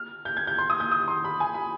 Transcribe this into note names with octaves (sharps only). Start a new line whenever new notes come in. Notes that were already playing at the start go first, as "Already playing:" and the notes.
Already playing: F6
G6
G#6
G6
C6
D#6
G6
D#6
C6
B5
G#5
B5